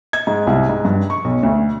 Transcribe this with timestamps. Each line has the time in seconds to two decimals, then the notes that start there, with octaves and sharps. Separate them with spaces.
0.13 G#6
0.27 G#2
0.47 C2
0.69 G#2
0.85 G2
1.10 C#6
1.25 B1
1.43 D2